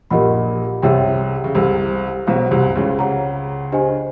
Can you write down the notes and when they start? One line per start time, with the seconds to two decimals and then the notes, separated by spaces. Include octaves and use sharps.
0.10 A#1 A#2 G4 A#4 D#5 F#5 B5
0.82 C2 C3 G#4 C#5 E5 G5
1.44 C#3
1.54 C2 C3 A4 C5 F5
2.27 B1 B2 G#4 C5 F5
2.51 C2 C3
2.76 C#2 C#3
2.99 G#4 C#5 F#5 A#5
3.72 D4 G4 C5 D#5 G#5